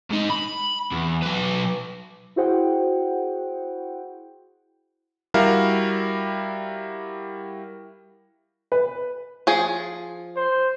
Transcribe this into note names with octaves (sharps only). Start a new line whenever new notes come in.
G#2 D#4
B5
E2
F#3 B4
E4 F#4 G#4 C5 F#5 G5
G3 E4 F#4 A#4 F5
B4
F3 G#4
C5